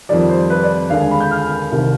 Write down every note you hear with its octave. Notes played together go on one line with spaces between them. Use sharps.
F2 D#3 G3 D5
C5
B4
D5
D#2 D3 G#3 F5
G#5
B5
G6
F6
C2 C3 D#3